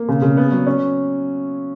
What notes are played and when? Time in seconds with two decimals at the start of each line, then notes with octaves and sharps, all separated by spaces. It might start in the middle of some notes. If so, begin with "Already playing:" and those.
Already playing: A#3
0.08 C#3
0.22 C#3
0.37 B3
0.51 F#3
0.66 C#4